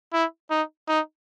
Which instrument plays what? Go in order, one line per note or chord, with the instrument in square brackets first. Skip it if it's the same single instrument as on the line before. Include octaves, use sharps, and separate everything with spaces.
[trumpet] E4
D#4
D#4